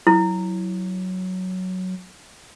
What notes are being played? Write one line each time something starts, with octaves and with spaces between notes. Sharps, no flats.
F#3 E4